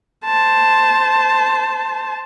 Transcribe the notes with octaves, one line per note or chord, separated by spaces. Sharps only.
C5 A5